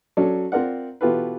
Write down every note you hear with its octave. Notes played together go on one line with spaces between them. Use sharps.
F#3 C#4 A4 D5
C4 F4 A#4 D5 F#5
B2 E3 F4 G4 A4 B4